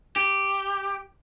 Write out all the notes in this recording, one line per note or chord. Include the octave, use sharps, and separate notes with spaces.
G4